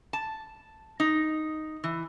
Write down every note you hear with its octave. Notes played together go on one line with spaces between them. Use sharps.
A5
D#4
E3